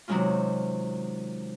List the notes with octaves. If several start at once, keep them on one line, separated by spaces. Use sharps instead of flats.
C3 D#3 F#3 G#3 C#4 F4